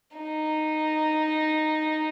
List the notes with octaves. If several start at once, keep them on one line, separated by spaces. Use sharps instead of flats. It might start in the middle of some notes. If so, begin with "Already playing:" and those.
D#4